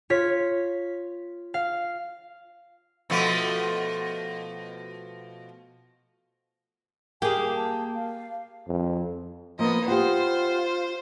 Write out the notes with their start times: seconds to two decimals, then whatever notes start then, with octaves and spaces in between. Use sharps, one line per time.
0.10 F4 C#5 B6
1.54 F5
3.10 B2 F3 A3
7.22 A#3 G4 G#4 G#5
7.56 A5
7.94 F5
8.68 F2
9.59 F3 A#3 B3 D#5
9.88 F4 G4 C5 F#5